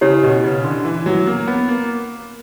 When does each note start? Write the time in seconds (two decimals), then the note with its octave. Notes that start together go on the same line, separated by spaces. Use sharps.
0.01 C#3 E4 G4 C#5
0.23 B2
0.44 C#3
0.64 D3
0.85 E3
1.06 F#3
1.27 A#3
1.47 B3
1.68 A#3